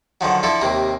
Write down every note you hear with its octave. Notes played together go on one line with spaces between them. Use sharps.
D3 D#3 F3 F#3
D3 F3 E4 A4
D#2 C3 A#3